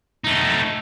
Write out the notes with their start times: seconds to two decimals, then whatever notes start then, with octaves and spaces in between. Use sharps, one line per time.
0.24 A3 D#4